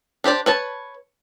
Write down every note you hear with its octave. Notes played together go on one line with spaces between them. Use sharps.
D4 G4 C5 D5
B4 C#5 A5